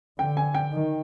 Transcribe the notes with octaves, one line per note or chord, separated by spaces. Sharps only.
D3 G5
G#5
G5
D#3